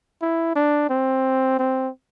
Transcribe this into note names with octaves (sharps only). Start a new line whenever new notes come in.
E4
D4
C4
C4